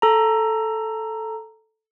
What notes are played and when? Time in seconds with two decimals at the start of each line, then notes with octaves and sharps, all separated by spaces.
0.02 A4 A#5